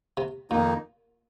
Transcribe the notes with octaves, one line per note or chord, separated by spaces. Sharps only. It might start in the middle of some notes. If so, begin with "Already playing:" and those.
C3
F2 A#2 D#3 A#3 D#4